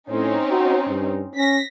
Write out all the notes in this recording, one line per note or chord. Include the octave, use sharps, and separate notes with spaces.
A2 C4 C#4 D#4
F#4
G2
C#4 A#6 B6